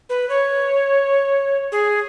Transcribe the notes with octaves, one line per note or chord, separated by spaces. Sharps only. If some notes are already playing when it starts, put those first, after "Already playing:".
B4
C#5
G#4